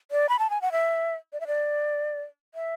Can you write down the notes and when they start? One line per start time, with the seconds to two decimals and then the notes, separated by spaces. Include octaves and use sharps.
0.11 D5
0.29 B5
0.39 A5
0.50 G#5
0.62 F#5
0.72 E5
1.33 D5
1.40 E5
1.47 D5
2.55 E5